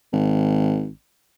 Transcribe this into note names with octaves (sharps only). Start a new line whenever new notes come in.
G#1